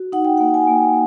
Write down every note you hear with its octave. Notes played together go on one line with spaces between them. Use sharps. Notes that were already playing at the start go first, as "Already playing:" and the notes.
Already playing: F#4
D#4 F#5
G5
A#3 F#5
G#5
A#3